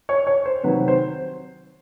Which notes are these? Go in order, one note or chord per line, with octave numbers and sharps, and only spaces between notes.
C#5
C#5
C5
C3 D#3 F#3 B4
C5